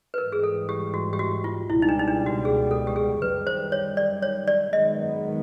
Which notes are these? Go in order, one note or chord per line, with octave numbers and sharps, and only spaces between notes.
B4
G#2 E3 G3 A#4
G#4
A4
G4
F#4
G4
F#4
F4
C#2 B2 G3 E4
D#4
D4
D#4
D4
F#4
G#4
A4
G4
G#4
F#2 D#3 G3 B4
C5
C#5
D5
C#5
D5
F#2 D#3 G#3 B3 D#5